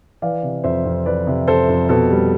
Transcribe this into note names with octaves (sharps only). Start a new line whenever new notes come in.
E3 D5 F5
C3
F2 C5 E5
F2
E3 B4 D5
C3
F2 A4 C5
F2
B2 A4
G3